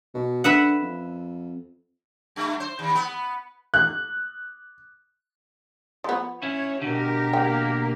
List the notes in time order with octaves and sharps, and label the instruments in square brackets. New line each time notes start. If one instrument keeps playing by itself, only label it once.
[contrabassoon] B2
[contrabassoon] D3 [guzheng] B4 E5 F#5
[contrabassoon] F2
[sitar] G2 A3
C5
D#2
B3
[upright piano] F#6
[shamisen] F3 B3
[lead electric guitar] C#4 E4 [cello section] C#5
[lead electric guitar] B2 D3 [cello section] G4 A#4
[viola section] A#3 [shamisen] G5